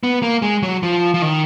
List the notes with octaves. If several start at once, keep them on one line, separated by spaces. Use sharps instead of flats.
B3
A#3
G#3
F#3
F3
F3
D#3